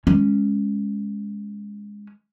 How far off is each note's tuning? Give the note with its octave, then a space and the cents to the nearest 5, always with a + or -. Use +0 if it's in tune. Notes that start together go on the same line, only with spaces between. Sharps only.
G#3 -10 C#4 +0